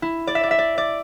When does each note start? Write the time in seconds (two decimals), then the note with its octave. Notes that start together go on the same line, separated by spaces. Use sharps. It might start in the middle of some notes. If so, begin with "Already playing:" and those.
0.02 E4
0.27 D5
0.35 E5
0.43 D5
0.51 E5
0.58 D5
0.78 D5